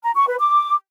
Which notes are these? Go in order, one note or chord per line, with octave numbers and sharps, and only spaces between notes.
A#5
C#6
B4
D6